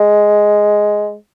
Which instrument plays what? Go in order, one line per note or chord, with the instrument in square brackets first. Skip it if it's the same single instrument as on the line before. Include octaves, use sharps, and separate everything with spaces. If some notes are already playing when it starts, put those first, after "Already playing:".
Already playing: [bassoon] G#3